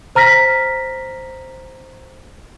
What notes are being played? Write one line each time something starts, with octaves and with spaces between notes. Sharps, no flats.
C5 A#5 F6 A#6 B6